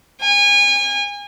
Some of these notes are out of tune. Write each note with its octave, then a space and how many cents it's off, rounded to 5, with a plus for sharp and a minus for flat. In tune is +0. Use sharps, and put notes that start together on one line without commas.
G#5 -30